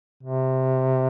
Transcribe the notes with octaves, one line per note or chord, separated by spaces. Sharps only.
C3